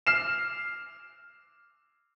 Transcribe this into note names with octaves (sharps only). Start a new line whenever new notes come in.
F6 C7 E7